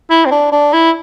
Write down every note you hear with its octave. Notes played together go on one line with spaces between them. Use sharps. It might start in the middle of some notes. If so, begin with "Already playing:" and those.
E4
C4
D4
D4
E4